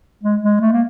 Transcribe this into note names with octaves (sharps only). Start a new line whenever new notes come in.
G#3
G#3
A3
A#3